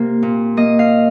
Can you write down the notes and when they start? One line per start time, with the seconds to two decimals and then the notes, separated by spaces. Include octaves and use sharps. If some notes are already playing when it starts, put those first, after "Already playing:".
Already playing: C3 A#3 A#4
0.23 A#2
0.57 A#3 D#5
0.79 F5